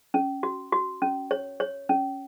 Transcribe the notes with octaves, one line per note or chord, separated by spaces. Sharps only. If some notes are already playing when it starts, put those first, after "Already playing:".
C#4
F#4
F#4
C#4
C#5
C#5
C#4